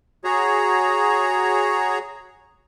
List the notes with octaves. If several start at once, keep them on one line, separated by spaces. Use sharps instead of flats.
F#4 G#4 C#5 A#5